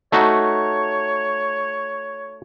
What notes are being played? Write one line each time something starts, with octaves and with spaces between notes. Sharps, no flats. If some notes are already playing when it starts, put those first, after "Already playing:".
A3 D#4 F#4 C#5